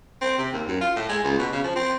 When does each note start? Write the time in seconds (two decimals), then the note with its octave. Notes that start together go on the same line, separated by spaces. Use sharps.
0.22 C4
0.39 C3
0.53 D#2
0.68 F#2
0.81 F4
0.96 A2
1.09 G#3
1.24 C#2
1.39 B2
1.52 C#3
1.64 F3
1.76 C4